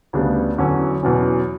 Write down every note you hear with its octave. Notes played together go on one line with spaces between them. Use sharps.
D2 C#3 G3 B3 D4
E2 D3 F#3 C#4
E2 B2 F#3 C#4